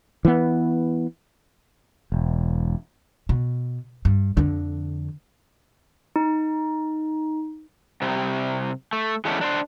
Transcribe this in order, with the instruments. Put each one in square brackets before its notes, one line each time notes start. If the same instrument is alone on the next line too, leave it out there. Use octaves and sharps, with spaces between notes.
[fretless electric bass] E3 B3
[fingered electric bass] E1
[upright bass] B2
G2
F2 D3
[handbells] D#4
[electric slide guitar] C3 G3
A3
E3 G#3 A3 B3 C#4 D4
D4 A#4 C5